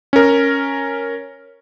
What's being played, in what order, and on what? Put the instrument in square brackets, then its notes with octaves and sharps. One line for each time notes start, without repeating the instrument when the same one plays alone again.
[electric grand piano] C#4 A#4